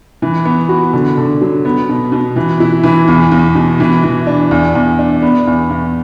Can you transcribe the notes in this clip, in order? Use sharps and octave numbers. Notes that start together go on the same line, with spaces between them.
E3
B3
F#4
D3
D3
F#3
B3
B2
B2
E3
E4
E3
E2
E2
B2
E3
E3
D4
E2
E2
D4
B3
E2
E2